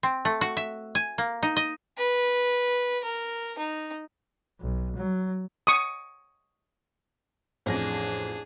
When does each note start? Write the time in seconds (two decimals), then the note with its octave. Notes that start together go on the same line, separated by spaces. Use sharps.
0.03 C4
0.25 A3
0.41 F#4
0.57 E5
0.95 G#5
1.18 A#3
1.43 D#4
1.57 D#5
1.97 B4
3.04 A#4
3.58 D#4
4.61 B1
4.96 F#3
5.67 C#6 D#6
7.66 A1 F2 D4 G#4 A#6